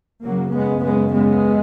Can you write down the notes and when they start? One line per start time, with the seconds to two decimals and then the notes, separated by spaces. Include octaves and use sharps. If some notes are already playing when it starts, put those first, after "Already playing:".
0.24 F#2 C#3 F#3 A#3
0.52 G#3 B3
0.81 G#3 B3
1.09 G#3 B3